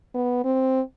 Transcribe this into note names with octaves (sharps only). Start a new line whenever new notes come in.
B3
C4